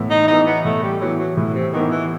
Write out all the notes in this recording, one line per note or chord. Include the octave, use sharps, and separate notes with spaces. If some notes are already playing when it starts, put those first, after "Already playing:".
Already playing: A2 E3 B3 E4
D#4
E3 B3 D#4 E4
B3
A2 A3
G3
E3 F#3 B3 E4
F#3
A2 E3
C3
D#3 E3 B3 E4
E3